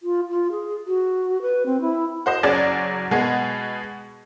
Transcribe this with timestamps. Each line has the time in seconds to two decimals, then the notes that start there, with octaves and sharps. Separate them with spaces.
0.03 F4
0.29 F4
0.51 G#4
0.87 F#4
1.42 B4
1.66 C4
1.81 E4
2.26 F#4 C5 D#5
2.43 F#1 F#3 C#4 G#4 D5 A6
3.11 B2 G#3 B3 G#4